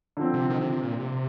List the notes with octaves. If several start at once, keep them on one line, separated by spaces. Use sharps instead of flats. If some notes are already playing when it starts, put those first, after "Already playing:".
D3 F3 C4
C3
D#3
C3
C3
A#2
C3